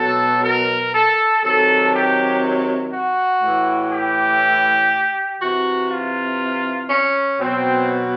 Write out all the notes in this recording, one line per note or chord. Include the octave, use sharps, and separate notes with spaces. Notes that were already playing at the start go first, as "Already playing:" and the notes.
Already playing: B2 F#3 A4
A#4
A4
C3 D#3 F#3 A4
G4
F#4
A2 E3
G4
C3 E3 F#4
F4
C#4
B2 F#3 C4